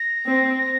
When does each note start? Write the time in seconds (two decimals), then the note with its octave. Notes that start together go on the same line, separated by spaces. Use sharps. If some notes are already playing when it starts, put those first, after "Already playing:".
Already playing: A#6
0.26 C4